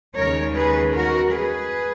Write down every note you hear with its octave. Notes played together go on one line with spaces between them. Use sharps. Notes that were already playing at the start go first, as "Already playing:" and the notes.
D#2 C#3 G#3 D#4 A#4 C#5
G#4 B4
F#4 A#4
G#4 B4